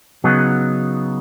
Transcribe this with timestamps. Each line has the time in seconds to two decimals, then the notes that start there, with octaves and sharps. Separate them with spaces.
0.24 C#3 F#3 B3 D#4 G#4